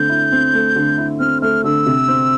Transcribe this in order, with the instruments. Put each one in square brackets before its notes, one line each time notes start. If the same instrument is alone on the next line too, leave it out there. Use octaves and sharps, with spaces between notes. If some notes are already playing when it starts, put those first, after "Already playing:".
Already playing: [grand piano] D3 A3 C4 [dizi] G6
[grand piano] E4
C4
A3
D3
E4
[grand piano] C4 [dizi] F6
[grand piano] A3 [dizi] F6
[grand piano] D3 [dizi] E6
[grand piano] C3
C4